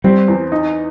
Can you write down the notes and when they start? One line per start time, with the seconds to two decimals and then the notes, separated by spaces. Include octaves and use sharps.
0.04 G3 C4
0.28 E2
0.52 D#4